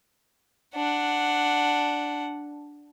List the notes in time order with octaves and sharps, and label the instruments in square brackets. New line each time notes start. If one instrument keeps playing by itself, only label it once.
[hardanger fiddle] D4 F#5